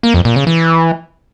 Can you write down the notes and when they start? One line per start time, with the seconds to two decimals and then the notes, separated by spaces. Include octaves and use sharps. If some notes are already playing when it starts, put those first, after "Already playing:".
0.03 A#3
0.14 F2
0.25 A#2
0.36 C#3
0.47 E3